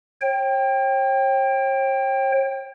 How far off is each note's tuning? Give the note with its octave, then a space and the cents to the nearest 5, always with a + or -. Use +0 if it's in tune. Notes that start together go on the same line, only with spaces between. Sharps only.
C#5 -45 G5 +0